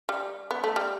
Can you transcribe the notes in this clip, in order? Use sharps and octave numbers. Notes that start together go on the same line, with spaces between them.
G3
B3
A3
G3